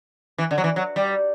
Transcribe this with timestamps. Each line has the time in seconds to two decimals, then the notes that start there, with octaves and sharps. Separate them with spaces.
0.38 E3
0.51 D3
0.58 F#3
0.64 E3
0.76 F#3
0.96 G3